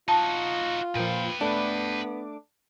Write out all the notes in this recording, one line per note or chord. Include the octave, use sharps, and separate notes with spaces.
D#4 F4 F#4 A5
A#2 F3 B4 G5
A3 B3 D4 D6